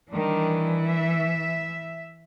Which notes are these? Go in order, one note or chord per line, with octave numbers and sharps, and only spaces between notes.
D#3 E3 G3 D4
E5